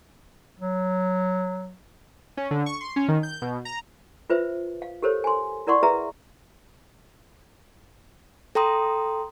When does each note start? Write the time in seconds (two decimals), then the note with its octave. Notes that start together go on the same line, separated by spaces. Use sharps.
0.59 F#3
2.37 C#4
2.51 D3
2.66 C#6
2.81 C6
2.96 C#4
3.08 D#3
3.23 G6
3.42 B2
3.65 A#5
4.30 F4 B4 C5 E5
4.82 F5
5.02 G4 A4 A#4 C5 C#5
5.24 G#5 C6
5.67 E4 A#4 D5 F#5 C6 C#6
5.83 G#4 B4 E5 A#5
8.55 A4 G5 A#5 C6 D#6